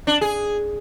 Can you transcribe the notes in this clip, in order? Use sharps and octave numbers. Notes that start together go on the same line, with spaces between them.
D4
G#4